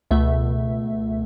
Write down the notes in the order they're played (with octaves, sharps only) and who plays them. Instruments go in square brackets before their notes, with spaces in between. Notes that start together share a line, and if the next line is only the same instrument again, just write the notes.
[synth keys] C#2 B2 A3 E5